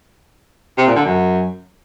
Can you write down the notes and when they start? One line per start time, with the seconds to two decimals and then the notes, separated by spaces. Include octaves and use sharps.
0.78 C3
0.87 A#2
0.96 D3
1.05 F#2